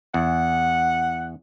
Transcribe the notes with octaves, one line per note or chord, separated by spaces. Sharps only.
E2 F#5